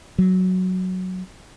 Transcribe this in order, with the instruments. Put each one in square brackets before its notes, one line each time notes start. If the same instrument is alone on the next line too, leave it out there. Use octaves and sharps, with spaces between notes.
[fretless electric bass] F#3